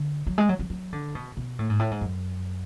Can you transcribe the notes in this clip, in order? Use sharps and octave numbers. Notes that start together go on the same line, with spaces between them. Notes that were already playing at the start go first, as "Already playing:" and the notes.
Already playing: D3
F#3
G#3
F#3
F#3
F#3
D3
B2
B2
A2
G#2
A2
G#2
F#2